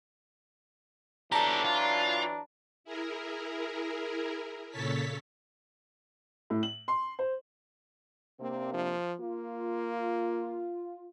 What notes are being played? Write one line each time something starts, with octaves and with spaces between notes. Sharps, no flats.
E3 F#3 D4 G4 A4 A5 A#5
F4
E4 G#4 A#4
A#2 C#3 A4 C#5 A5 B6
A2
F#7
C6
C5
C3 A#3 C4 D4
F3
A#3 F4